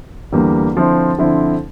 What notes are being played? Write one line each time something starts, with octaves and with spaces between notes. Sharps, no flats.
E2 D3 G3 A#3
D3 F3 C4 E4
D3 F3 C4 E4